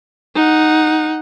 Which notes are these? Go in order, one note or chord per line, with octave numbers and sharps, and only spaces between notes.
D#4 F#5